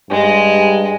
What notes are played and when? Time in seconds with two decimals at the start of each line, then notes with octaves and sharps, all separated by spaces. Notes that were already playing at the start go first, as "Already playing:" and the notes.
0.11 G2 G#3